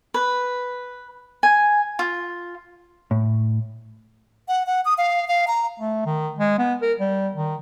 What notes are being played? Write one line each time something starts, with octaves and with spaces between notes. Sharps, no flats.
B4
G#5
F4
A2
F#5
F#5
D#6
F5
F5
A#5
A3
D#3
G#3
B3
A#4
G3
D#3